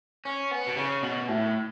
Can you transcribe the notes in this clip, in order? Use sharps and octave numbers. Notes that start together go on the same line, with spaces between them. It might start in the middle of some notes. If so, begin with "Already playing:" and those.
C#4
B3
B2
C#3
B2
A2